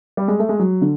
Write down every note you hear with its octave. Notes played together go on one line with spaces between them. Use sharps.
G3
G#3
A3
G#3
F#3
D3